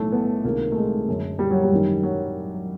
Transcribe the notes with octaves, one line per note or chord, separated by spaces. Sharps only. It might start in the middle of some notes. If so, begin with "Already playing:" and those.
Already playing: B1 A2 E3 A3
B3
C#2 C3 D#3 A#3
A3
G#3
F#1 F#2 D3
G3
F#3
G3
G#1 F#2 D#3
F#3